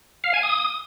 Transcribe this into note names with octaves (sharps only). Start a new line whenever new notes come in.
F5
G#5
D#6